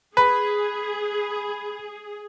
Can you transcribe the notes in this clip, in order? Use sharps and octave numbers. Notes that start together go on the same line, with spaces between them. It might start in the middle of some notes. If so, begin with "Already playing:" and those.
G#4 B4